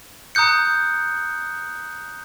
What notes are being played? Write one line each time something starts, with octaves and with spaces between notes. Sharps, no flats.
A#5 D#6 F#6 G6 C#7